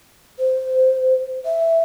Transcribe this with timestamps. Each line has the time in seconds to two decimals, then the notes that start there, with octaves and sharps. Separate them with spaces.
0.39 C5
1.45 E5